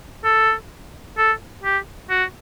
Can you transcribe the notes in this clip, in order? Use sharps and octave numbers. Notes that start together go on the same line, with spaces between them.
A4
A4
G4
F#4